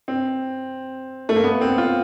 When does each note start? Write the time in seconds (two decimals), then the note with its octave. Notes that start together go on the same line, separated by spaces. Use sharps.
0.08 C4
1.29 A3
1.36 A#3
1.44 B3
1.61 C4
1.78 F4